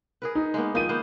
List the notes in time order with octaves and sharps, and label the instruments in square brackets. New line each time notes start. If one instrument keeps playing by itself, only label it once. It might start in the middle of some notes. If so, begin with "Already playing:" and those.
[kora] G#4 A#4 B4
[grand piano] D#4
[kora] G#3 A#3 B3
[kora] D#3 F3 D#4 [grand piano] F5 D#7
[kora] A#3 B3 C5